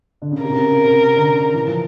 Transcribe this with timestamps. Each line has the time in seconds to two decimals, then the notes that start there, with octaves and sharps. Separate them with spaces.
0.22 D3
0.32 C#3
0.42 C3 A#4
0.50 C#3
0.56 C3
0.71 C#3
0.84 C3
1.17 D3
1.35 C#3
1.54 E3
1.67 F3